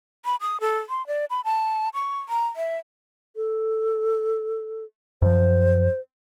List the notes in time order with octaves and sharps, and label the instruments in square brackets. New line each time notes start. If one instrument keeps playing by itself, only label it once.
[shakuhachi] B5
D#6
A4
C6
D5
B5
A5
C#6
A#5
E5
[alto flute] A4
[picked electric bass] F#2 F3 [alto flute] C5